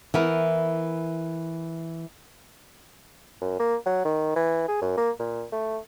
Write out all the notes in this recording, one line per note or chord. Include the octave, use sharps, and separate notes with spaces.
E3 B3 A#4
F#2
A#3
F#3
D#3
E3
G#4
F#2
A#3
A#2
A3